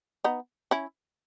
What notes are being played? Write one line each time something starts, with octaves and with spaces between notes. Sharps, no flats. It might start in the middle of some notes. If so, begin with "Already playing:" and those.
B3 D#4
C#4 E4